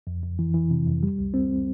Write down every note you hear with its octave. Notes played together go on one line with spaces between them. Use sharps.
F2
F2
E3
E3
C3
F2
G3
C2
C4